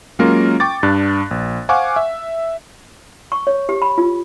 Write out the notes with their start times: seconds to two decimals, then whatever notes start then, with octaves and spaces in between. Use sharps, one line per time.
0.19 F#3 G#3 A#3 C#4 F4 A#4
0.60 G5 C#6 D6 A6
0.83 G2 D4 F#6
1.31 A#1
1.69 C5 F5 F#5 G#5 C#6 D6
1.96 E5
3.32 C#6
3.47 C#5
3.69 G4
3.82 B5
3.98 F4